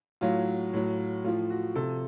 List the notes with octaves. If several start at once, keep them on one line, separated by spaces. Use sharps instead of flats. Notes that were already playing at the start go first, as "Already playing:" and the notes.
A2 F#3 F4
A2 F#3
A2 F3 F4
F#4
C3 F3 A4